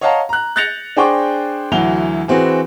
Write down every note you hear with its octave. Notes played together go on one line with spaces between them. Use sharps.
C#5 D#5 F5 F#5 A5 A#5
A#5 F#6
F#6 G6 A6 A#6 C#7 F7
D4 G#4 C5 G5 C#6 D6
D2 E3 F#3 F7 G7
E3 C4 F#4 G#4 B4